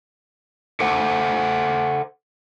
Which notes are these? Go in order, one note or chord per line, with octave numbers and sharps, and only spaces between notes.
A4 C5 E5 F#5